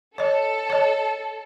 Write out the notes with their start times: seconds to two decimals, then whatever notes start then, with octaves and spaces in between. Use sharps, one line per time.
0.18 A4 C#5 D#5
0.70 C#5 D#5